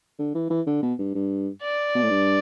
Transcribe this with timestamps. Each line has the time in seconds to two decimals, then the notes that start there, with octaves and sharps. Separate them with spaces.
0.19 D3
0.35 E3
0.50 E3
0.67 D3
0.83 B2
0.99 G2
1.15 G2
1.63 D5
1.95 B2
2.03 A2
2.10 G2